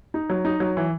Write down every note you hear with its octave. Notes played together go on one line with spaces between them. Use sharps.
D#4
F#3
D#4
F#3
E3